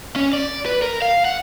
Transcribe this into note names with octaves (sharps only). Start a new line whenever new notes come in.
C#4
D5
B4
A#4
F5
F#5